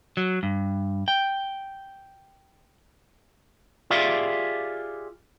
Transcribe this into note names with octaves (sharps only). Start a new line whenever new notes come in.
F#3
G2
G5
F4 G4 G#4 D5 E5 F5